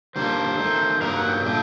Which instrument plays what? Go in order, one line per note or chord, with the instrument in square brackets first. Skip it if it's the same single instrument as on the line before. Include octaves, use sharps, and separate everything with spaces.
[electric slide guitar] D#3 G3 A#3 D4 [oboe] C5
[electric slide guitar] D#3 A3 D#4
[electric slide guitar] G2 F#3 A#3 D#4 [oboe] A#4
[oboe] F#5
G5
[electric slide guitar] A#2 A3 D4 [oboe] G5